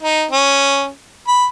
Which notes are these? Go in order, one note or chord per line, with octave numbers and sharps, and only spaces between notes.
D#4
C#4
B5